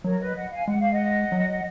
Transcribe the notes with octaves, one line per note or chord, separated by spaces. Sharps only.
F#3 A#4 C#5
B4 D#5
D#5 F#5
F5 G#5
G#3 F#5
F5
D#5 F#5
F#3